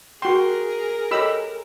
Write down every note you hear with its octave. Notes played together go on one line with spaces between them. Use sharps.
F#4 G#4 A#4 G5 C6
G4 A4 C#5 D#5 B5 E6